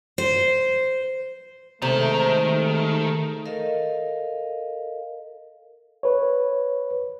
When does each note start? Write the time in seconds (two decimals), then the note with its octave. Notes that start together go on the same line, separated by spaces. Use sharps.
0.18 C5
1.82 C3 D#3 G#3 A3 C5
3.45 A4 A#4 D#5 F5
6.03 B4 C#5